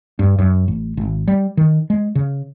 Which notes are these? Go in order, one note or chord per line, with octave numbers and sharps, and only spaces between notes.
G2
F#2
A1
G#1
G3
D#3
G#3
C#3